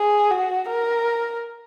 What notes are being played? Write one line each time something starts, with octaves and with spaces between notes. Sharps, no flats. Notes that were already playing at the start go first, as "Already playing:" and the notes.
Already playing: G#4
F#4
A#4